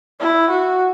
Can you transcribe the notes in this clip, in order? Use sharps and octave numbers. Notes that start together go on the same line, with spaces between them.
E4
F#4